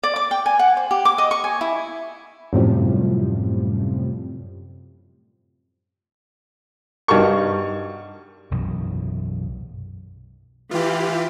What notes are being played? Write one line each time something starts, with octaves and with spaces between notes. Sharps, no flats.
D5
D6
G5
G#5
F#5
C5
G4
D6
D#5
C#6
G#5
E4
F#2 A2 C3 F3 G3
G2 D#4 F#4 A#4 C#6
B1 F#2 B2 E3
E3 F4 G4